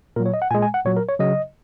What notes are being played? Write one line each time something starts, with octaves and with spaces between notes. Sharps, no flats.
A#2 F#3 A#4
C#5
D#5
F#5
A#2 G#3 G#5
G#5
F#5
A#2 F#3 C#5
A#4
C#5
C#3 F#3 D#5